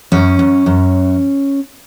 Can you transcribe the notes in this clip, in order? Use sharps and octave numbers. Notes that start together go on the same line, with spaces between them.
F#2 C#4
F#2
F#2